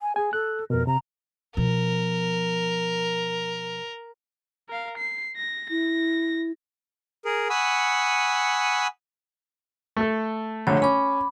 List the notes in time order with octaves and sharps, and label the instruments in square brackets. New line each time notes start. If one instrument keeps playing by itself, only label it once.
[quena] G#5
[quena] G#4 [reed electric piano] G#5
[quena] A4 [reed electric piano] F#6
[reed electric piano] F2 B2 [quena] A#4
[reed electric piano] C3 [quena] A#5
[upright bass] B2 F3 [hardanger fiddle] A#4
[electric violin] A#4 F5
C7
A#6
[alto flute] E4 [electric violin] A#6
[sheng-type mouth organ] G#4 A#4
F#5 G#5 B5 C#6 D#6 E6
[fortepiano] A3 A4
[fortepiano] A#1 D3 A3 [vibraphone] C#5
[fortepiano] C#4 [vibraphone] B5 D6